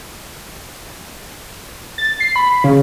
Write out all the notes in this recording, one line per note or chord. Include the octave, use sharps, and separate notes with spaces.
A6
C7
B5
C#3